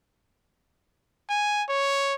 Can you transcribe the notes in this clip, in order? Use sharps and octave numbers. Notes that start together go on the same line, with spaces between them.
G#5
C#5